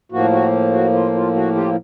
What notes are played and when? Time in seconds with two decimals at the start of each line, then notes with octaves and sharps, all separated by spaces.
0.12 A2 F3 A#3 F#4
0.32 F#4
0.72 F#4
0.93 F4
1.15 F4
1.35 F#4
1.55 F4 G4